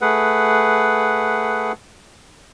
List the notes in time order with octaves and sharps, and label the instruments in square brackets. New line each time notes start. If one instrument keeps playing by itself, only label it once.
[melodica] A3 G#4 B4 F#5